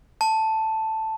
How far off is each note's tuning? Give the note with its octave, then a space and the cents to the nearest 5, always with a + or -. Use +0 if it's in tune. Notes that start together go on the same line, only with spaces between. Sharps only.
A5 +5